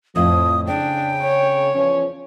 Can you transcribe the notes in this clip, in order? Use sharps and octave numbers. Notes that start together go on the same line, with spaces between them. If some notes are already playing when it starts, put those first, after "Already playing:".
F2 A2 F3 D#6
C#3 C4 D4 G5
C#5
E2 F3 C#4